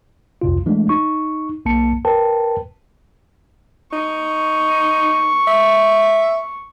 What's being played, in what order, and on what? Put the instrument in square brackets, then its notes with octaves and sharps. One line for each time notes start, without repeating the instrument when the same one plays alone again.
[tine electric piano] C2 F2 C3 F4
E3 G#3 A3 D4
D#4 C#6
B1 A#3 A5 C#7
A#4 B4 G5 A5
[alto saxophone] D#4 [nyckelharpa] C#6
[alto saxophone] E5